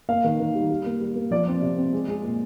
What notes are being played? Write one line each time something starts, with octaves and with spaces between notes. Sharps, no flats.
A#3 F5
D#3
D#3
G3
G3
A#3
G3
A#3
F3 D5
C4
C3
C4
G#3
G#3
A#2